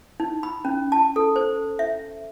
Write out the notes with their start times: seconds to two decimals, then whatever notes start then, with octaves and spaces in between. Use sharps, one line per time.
0.20 D#4
0.43 B5
0.65 C#4
0.92 A5
1.16 A4
1.36 C5
1.79 E5